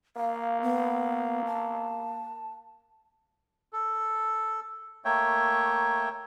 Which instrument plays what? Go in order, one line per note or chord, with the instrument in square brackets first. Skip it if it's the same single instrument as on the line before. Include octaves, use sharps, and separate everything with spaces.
[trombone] A#3 [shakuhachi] F5
[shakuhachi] B3
A5
[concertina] A4
A3 A#3 C#5 E5 G5